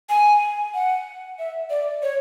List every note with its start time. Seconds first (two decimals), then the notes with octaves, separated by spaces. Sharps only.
0.10 G#5
0.74 F#5
1.39 E5
1.70 D5
2.03 C#5